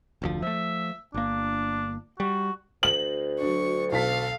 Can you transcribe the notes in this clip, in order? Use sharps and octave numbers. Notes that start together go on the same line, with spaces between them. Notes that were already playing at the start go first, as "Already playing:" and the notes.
F1 D2 F3
F3 A3 E5
G1 A#3 D4
G3 F#4
D2 F#7
F#3 D4 C#6
B1 A4 F5 A5 B6